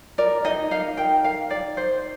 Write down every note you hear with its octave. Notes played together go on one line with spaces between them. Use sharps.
A#4 D5
D#4 D#5
D#4 F5
A#4 G5
A#4 F5
D#4 D5
D#4 C5